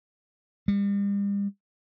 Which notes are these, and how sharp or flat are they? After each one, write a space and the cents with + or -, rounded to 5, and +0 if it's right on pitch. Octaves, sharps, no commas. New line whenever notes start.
G3 +40